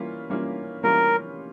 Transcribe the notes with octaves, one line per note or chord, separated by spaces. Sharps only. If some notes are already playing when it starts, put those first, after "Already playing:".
Already playing: E3 G3 A#3 C#4 F4
E3 G3 A#3 C#4 F4
E3 G3 A#3 C#4 F4 A#4